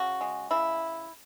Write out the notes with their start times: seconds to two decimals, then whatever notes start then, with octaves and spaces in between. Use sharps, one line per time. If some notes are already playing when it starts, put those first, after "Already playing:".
Already playing: C#3 F#4
0.21 G#3
0.51 C#3 E4